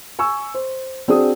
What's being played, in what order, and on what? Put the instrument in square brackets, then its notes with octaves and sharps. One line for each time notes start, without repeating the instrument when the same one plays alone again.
[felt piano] G#5 C#6 E6
C5
C4 D4 F#4 G#4 D#6